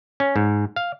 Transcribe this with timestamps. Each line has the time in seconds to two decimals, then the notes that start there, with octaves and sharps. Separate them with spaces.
0.20 C#4
0.36 G#2
0.76 F5